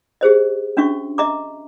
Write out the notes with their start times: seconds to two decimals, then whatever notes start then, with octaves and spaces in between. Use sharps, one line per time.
0.21 G4 G#4 C5 D#5
0.77 C#4 D4 F#4 E5 C#6
1.18 D#5 E5 A#5 D6